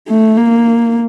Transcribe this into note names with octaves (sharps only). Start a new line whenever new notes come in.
A3
A#3